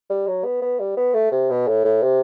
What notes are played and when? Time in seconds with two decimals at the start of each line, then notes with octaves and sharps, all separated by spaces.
0.10 G3
0.27 F#3
0.44 B3
0.62 B3
0.80 G3
0.97 B3
1.14 A3
1.32 C3
1.50 B2
1.68 A2
1.84 A2
2.03 C3